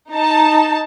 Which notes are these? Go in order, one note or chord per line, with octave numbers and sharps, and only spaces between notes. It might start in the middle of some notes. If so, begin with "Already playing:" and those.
D#4 A5